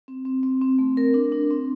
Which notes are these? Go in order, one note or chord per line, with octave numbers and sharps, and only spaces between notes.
C4
C4
C4
C4
A3
A#4
D4
D4
C4